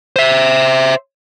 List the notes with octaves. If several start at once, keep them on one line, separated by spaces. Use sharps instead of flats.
C5 E5